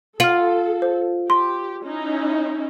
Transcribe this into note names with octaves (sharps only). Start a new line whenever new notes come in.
F4 A4 F6 F#7
C5
G4 C6
C#4 D#4 E4